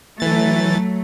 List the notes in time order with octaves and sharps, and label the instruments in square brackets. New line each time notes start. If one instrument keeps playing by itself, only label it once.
[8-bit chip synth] E3 A6 [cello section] F#3 A3